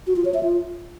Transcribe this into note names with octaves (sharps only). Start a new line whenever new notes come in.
F#4
F4
C#5
E5
F4